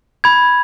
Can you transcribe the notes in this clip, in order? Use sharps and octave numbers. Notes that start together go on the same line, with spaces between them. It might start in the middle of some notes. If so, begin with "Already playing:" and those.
B5 G#6